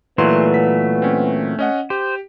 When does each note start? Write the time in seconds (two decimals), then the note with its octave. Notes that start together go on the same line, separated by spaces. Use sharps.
0.18 A#2 E3 F#3 A3 B3 C6
0.54 B6
1.02 C4 C#4
1.59 C#4 D#5 F#5
1.90 G4 C5